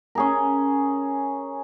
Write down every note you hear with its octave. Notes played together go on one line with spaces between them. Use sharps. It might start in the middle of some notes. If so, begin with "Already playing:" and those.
C#4 G#4 A#4